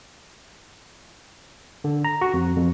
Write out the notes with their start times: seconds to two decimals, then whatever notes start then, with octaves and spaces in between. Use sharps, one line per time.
1.84 D3
2.05 A#5
2.21 F#4
2.34 F2
2.56 F2